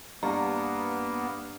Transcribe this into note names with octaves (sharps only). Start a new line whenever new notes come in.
G2 A#3 B3 A#5